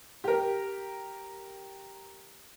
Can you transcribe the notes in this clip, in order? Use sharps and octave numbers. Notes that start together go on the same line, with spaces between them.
G4 A#4